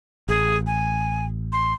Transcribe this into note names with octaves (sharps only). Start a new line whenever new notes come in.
A1 G#4
G#5
C6